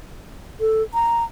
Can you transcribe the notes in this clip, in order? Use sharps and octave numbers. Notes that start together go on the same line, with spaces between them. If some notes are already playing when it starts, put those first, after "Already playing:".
A4
A#5